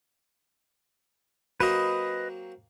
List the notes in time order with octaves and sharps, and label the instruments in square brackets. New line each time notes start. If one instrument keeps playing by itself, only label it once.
[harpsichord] F#3 A#3 C4 [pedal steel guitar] B4 D#5